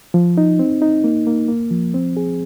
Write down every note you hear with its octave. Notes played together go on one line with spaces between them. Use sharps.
F3
D#4
C4
D#4
A#3
A#3
A#3
F3
C4
G#4